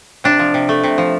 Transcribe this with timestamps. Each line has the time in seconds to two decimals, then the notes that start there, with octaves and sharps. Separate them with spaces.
0.24 C3 D4
0.39 F3
0.54 C3
0.69 A3
0.84 C3
0.98 F3